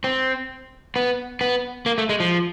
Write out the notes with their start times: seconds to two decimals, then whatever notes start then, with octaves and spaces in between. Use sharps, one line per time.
0.04 C4
0.96 B3
1.41 B3
1.86 A#3
1.98 A3
2.09 G#3
2.20 F3